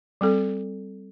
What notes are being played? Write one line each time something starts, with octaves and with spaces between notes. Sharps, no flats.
G3 C4 A4